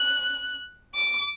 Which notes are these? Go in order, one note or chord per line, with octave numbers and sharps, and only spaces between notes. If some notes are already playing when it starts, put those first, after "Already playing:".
Already playing: F#6
D6